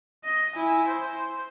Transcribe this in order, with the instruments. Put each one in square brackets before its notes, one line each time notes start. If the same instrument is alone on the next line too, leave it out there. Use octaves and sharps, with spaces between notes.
[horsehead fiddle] D#5
E4 G#5
C5